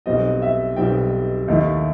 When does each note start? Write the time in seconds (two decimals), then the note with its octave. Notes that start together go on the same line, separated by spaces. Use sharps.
0.06 B1 B2 G3 C4 D#5
0.42 E5
0.76 B1 B2 G3 C4 G5
1.48 D#2 D#3 A3 E4